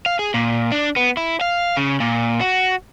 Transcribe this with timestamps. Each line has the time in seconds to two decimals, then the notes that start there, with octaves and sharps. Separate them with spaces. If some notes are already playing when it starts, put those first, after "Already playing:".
0.06 F5
0.19 G#4
0.34 A#2
0.72 D4
0.96 B3
1.17 E4
1.41 F5
1.77 C#3
2.00 A#2
2.41 F#4